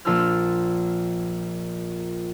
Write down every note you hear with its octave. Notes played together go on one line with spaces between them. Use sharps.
A#1 F4 A5 E6 F6